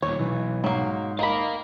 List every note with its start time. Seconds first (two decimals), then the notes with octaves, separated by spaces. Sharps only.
0.02 D#2 A#2 C#5
0.19 B1 E3
0.64 G#2 F#3 A#3
1.19 D#3 A#4 D#5 F5 B5